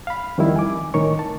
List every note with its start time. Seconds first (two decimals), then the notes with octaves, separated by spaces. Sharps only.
0.07 F5 B5
0.38 F2 D#3 G3 E4
0.56 G#5 D6
0.94 C2 A2 D#3 A#4 C#5 C#6
1.19 A5